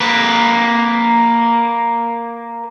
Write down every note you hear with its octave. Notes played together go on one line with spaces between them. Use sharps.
A#3 B4